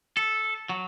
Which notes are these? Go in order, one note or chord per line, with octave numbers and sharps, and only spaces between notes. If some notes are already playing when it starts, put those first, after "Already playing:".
A4
F#3